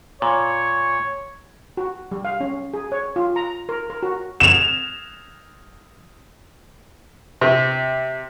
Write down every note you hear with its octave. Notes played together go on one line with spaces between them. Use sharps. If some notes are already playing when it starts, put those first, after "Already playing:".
A#2 C#5
F#4
G3
F5
C#4
G#4
C#5
F4
A#5
A#4
A#4
F#4
E7 F7
C3